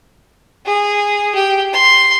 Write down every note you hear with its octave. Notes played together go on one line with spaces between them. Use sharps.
G#4
G4
C6